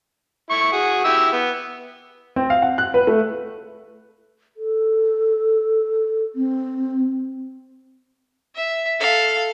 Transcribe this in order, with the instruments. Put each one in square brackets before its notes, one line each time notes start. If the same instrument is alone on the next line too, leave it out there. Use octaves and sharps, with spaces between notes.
[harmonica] E4 C#6
F#4 G#4
E4 G4 E6
B3
[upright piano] C4
F5
F#5
F#6
B4
A3
[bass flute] A4
C4
[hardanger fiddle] E5
A4 F5